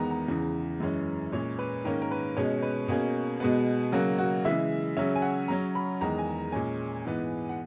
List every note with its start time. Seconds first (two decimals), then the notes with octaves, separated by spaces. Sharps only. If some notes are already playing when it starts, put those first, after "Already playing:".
Already playing: E2 D#3 G#3 B3 A#5
0.11 A#5
0.28 E2 C#3 E3
0.80 F#2 E3 G#3 C#4
1.32 A#2 G#3 C#4 C#5
1.59 B4
1.85 G#2 D#3 A#3 C#4 A#4
2.02 A#4
2.11 B4
2.37 B2 G#3 C#4 C#5
2.62 B4
2.88 B2 A#3 C#4 G#4
3.40 B2 G#3 B3
3.92 C#3 F#3 A#3 F#4
4.19 F#4
4.45 C#3 E3 G#3 E5
4.97 C#3 F#3 C#4 E5
5.15 G#5
5.22 F#5
5.48 C#3 F#3 C#4 A#5
5.75 B5
6.01 E2 D#3 G#3 A#5
6.19 G#5
6.52 A#2 G#3 C#4 G#5
7.05 G#2 E3 B3
7.49 F#5